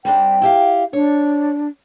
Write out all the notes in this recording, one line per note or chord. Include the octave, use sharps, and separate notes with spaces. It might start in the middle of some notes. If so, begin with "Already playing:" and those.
G3 C4 D4 G5
E4 G4 F5
D4 C#5